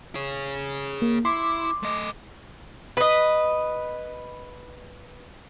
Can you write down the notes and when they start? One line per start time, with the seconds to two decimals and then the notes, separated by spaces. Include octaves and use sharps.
0.15 G#4 C#5
1.02 A#3
1.25 E4 C6 D6
1.83 A3 D#5
2.97 B4 D#5